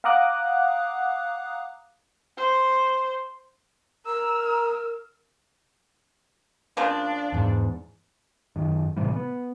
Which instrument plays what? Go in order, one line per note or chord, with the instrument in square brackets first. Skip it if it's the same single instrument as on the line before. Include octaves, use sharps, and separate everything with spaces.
[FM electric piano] F5 F#5 A#5 D6 D#6 F#6
[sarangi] C5
[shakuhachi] A#4 [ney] A#5 [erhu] E6
[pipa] C#3 F3 A#3 [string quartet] D4
[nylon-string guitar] E2 G#2
[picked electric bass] F#2 D#3
A2 C3 E3 G3
B3